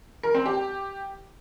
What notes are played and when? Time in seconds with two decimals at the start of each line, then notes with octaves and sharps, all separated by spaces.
0.23 A#4
0.35 C4
0.46 G4